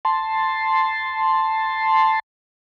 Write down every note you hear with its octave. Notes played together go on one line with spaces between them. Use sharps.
A5 C6